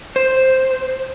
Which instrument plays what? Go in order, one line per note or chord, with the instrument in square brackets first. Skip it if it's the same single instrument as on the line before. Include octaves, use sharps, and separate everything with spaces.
[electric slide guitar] C5